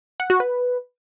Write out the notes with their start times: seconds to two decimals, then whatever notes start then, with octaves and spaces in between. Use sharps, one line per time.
0.20 F#5
0.30 F#4
0.40 B4